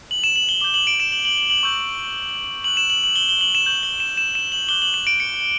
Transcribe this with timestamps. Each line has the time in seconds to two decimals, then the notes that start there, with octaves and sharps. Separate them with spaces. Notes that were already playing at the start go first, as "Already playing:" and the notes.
0.11 F#7
0.24 E7
0.36 F#7
0.49 G7
0.61 D6 G6 G7
0.74 F#7
0.87 D7
1.00 E7
1.12 F#7
1.25 F#7
1.38 F#7
1.50 F#7
1.63 C#6 E6 G6
2.64 C#6 F#6 F#7
2.77 E7
2.90 F#7
3.04 F#7
3.16 G7
3.29 G7
3.41 F#7
3.55 E7
3.66 C#6 G6 F#7
3.83 G7
4.00 E7
4.17 E7
4.35 E7
4.52 F#7
4.69 D6 F#6 G7
4.82 F#7
4.94 E7
5.07 D7
5.20 C#7